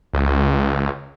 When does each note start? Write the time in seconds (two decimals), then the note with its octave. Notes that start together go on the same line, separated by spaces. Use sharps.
0.14 C#2